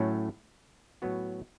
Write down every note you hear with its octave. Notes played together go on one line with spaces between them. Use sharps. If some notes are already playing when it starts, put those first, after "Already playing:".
Already playing: A2 F#3 A3 C#4
A2 F#3 B3 F#4